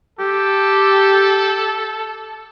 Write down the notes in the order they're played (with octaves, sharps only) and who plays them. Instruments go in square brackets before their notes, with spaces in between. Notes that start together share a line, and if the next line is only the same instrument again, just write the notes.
[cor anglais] G4 [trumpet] A4